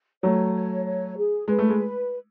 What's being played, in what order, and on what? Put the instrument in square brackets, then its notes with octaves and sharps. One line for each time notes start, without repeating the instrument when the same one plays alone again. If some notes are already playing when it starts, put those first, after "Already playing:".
[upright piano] F#3 A3 [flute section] C#5
[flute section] C#5
C#5
G#4
[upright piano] G#3 [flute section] B4
[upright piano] A3
G#3